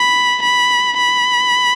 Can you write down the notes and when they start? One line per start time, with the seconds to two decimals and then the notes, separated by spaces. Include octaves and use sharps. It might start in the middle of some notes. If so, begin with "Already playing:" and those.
Already playing: B5
0.42 B5
0.98 B5